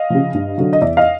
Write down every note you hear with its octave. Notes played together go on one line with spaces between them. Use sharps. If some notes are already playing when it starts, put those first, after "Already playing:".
Already playing: D#5 F5
C#3 F3
G2
D3 F#3
D#5
E2 D5 E5
D#5 F5